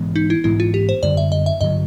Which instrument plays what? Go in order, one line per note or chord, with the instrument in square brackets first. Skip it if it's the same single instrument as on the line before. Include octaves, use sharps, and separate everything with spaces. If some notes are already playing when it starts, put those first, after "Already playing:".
Already playing: [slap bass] G#2 E3 G#3 B3
[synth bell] D#4
E4
[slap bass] G#2 E3 G#3 B3 [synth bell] E4
[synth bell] F4
G4
C5
[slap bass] F#2 D3 G3 [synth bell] D5
[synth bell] E5
D#5
E5
[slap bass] G2 D3 F#3 [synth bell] D#5